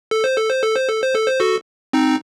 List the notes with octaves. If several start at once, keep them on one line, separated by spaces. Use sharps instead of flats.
A4
C5
A4
C5
A4
C5
A4
C5
A4
C5
F#4 A4
C4 D#4